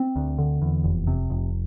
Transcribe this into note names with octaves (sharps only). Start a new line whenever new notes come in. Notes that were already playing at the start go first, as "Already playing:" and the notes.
Already playing: C4
D2
D3
E2
F1
C3
F1